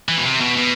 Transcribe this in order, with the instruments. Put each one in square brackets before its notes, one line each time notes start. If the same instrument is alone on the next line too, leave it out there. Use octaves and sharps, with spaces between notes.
[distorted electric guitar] E3
B2
C3
B2
B2